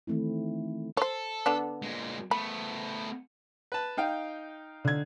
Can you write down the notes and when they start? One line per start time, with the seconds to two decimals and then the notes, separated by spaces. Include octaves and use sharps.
0.07 D#3 E3 A3 C4 E4
0.97 A4 C5 C#5
1.46 D3 B3 D4
1.82 A#2 G#3
2.31 A3 B3 B5
3.72 B4 A5
3.97 D#4 F5 G5
4.85 D3 G#6